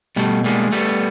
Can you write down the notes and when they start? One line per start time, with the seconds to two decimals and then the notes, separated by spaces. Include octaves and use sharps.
0.16 B2 G3 A3
0.44 G3 G#3 A#3
0.72 G3 A3 B3